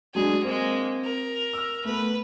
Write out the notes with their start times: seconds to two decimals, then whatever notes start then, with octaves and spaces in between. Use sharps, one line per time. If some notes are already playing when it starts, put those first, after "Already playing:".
0.15 F#3 G#3 D4 G#4
0.44 G#3 A#3 C4
1.05 A#4
1.53 E6 F6
1.85 A3 B3 B4